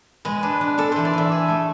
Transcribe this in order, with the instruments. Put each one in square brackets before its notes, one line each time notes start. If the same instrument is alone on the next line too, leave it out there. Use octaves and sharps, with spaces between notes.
[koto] G#3 [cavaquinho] B4
[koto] D4
D4
[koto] D4 [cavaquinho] A4
[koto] E3 [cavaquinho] C5
[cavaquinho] D5
[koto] E3 [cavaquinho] E5
[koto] G#4
A3